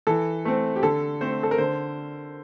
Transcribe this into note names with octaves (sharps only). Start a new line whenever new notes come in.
E3 A4
A3 C4
G4
D3 A4
A3 C4 C5
A4
A#4
D3 C5